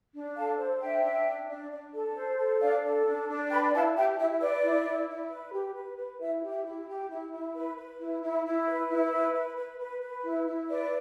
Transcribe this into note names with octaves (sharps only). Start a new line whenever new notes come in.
D4
A4 F5 A5
C5
D4 E5 G5
D4
D4
D4
D4
A4
C5
A4
D4 D5 F5
A4
D4
D4
B4 G5 B5
E4 F5 A5
G4 E5 G5
E4 E5
B4 D5
E4
E4
E4
B4
G4
B4
B4
E4 E5
G4
E5
E4
G4
E4
E4
B4
B4
E4
E4
E4
B4
E4
B4
B4
B4
B4
B4
E4
E4
B4 D5